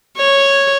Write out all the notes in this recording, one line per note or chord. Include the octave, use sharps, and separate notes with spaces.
C#5